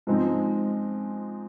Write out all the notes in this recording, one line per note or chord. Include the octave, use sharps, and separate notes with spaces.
G#2 F3 G#3 C4 D#4